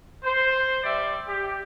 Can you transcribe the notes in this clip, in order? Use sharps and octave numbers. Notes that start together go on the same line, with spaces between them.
C5
G3 D5 E5
G4